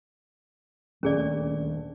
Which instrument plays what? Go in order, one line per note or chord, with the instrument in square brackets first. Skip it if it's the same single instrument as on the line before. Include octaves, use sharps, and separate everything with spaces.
[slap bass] D#1 D2 A3 [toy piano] C#4 G#4 D5